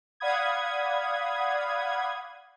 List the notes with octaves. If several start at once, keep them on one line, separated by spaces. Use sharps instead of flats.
D5 F5 F#5 B5 D#6 G#6